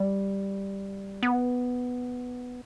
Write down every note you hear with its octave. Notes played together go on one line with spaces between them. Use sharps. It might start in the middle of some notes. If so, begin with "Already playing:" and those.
Already playing: G3
B3